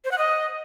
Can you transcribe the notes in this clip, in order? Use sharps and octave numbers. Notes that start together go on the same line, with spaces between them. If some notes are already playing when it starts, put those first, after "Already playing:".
C5
F#5
D#5